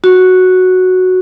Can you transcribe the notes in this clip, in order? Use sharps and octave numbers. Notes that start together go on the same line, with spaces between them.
F#4